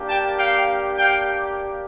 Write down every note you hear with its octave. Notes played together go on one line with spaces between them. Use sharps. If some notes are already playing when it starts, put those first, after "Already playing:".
Already playing: A#3 D4 G4
G5 A5
F5 G5
F5 G5